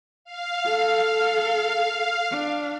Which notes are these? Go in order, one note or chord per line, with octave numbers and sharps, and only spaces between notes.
F5
A4
D4